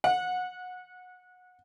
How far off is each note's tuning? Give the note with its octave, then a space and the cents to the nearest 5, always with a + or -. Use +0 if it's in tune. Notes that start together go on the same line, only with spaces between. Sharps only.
F#5 -25